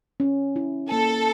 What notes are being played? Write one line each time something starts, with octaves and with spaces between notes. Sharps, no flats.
C#4
E4
A#3 A4